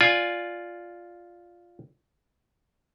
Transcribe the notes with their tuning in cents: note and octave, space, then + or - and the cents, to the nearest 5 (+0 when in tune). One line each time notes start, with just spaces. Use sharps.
F4 +0 D5 +0 G#5 +0